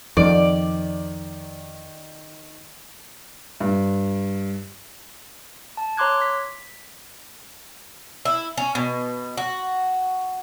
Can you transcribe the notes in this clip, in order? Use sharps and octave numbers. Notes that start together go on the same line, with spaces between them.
F2 D#3 D5
G2
A5
C#5 A#5 C6 D6 F#6 G#6
B6
E4
C#4
B2
F#4